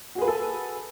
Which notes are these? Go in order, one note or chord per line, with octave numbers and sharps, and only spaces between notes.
F#4 G#4 A4 B4 G#5